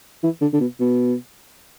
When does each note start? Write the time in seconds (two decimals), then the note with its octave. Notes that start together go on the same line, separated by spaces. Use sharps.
0.23 E3
0.41 D3
0.53 D3
0.61 B2
0.80 B2